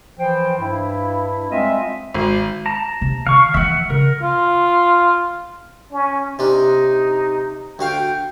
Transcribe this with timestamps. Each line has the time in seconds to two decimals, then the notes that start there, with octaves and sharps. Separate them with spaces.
0.19 E3 F3 C5 G5
0.59 G2 E4
1.50 G3 G#3 C4 F4 D#5 E5
2.14 G#1
2.66 A5 A#5
3.01 C3
3.27 D#3 F5 C#6
3.54 E3 F3 E5 F#5
3.90 C#3 A#4
4.22 F4
5.92 C#4
6.39 C3 D4 D#4
7.79 D2 F#4 F5 G5